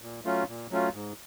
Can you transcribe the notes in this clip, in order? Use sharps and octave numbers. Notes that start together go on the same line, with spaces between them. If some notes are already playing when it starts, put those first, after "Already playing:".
A#2
F#3 A3 C#4 F4
A#2
F#3 A3 C#4 F4
G#2